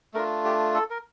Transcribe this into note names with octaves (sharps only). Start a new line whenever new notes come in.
A3 D4 F4 A#4
G4
A4
A#4